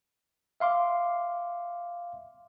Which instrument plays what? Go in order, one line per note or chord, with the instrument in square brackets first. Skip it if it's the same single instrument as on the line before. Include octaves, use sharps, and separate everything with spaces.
[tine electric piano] E5 F5 C6 D6